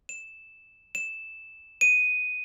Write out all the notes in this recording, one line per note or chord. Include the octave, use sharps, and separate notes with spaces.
E7
E7
D#7